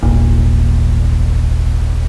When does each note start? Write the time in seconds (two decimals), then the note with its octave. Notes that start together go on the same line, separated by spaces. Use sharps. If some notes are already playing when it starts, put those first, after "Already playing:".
0.03 D#1 G#1 A#2